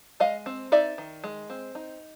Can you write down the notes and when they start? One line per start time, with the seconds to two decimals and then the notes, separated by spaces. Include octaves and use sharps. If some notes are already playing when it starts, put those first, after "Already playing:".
0.20 G#3 D#5 F5
0.46 C4
0.72 D#4 D5 E5
0.98 D#3
1.24 G#3
1.50 C4
1.75 D#4